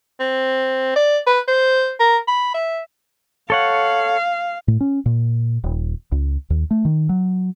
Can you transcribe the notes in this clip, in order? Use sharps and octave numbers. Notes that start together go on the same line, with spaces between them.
C4
D5
B4
C5
A#4
B5
E5
A4 C#5 F5 F#5
A2
C#4
A#2
D#1
C#2
D#2
A3
D#3
F#3